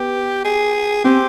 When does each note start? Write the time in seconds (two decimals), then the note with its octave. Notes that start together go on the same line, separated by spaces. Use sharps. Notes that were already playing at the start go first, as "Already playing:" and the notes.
Already playing: B3 G4
0.45 G#4
1.04 C4 G4